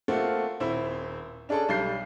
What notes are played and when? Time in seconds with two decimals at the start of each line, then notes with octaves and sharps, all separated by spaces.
0.08 A3 A#3 C4 F4 F#4
0.60 D#1 C4 E4
1.49 C#4 D4 G#4 A4 D5
1.69 B1 G3 G6 C7